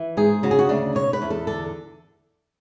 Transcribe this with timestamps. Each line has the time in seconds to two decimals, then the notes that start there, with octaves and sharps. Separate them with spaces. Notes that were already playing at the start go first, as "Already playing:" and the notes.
Already playing: E3
0.17 G#2 G#4
0.43 C#3 F#4
0.51 G#4
0.59 F#4
0.69 D2 D4
0.95 B2 C#5
1.13 B4
1.22 E2
1.30 A4
1.47 D3 A4